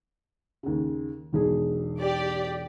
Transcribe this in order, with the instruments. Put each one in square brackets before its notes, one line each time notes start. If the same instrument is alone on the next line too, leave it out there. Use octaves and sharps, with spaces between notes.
[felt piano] D#2 C#3
E1 B1 G#4
[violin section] G4 D5